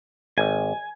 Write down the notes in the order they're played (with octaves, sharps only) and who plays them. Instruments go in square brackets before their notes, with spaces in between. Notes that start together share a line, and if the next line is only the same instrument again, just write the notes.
[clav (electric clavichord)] G#1 [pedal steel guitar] G#5